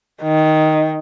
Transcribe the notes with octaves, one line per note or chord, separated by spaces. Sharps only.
D#3